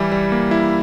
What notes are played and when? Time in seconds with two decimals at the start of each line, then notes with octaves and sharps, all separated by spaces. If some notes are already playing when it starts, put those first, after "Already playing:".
Already playing: E3 G3 E4
0.12 G3
0.32 A#3
0.51 E4